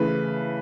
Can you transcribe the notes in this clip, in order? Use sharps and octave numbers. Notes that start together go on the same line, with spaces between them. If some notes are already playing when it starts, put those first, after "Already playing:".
Already playing: C#3 E3 A3 B4